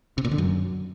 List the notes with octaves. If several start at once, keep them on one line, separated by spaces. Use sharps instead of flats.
C3
A#2
D3
F#2